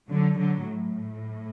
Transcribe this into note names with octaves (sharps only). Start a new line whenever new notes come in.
D3 F#3
D3 F#3
A2